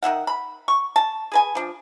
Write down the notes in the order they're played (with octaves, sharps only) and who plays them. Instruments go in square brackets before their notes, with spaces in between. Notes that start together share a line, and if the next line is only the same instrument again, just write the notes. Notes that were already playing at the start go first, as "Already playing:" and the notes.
[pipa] D#3 E4 E5 F#5
B5
C#6
A5
G#4 B4 G#5
F3 D4